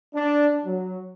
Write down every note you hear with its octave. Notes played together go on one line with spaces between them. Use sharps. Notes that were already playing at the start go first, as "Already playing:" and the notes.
D4
F#3